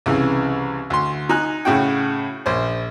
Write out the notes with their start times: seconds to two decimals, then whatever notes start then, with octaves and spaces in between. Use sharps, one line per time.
0.06 C2 C#3 E3
0.90 D2 C6
1.29 D#4 G#5 F#6
1.65 A2 C#3 F#4 G5
2.46 A#1 C5